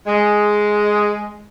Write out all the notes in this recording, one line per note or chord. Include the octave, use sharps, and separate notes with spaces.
G#3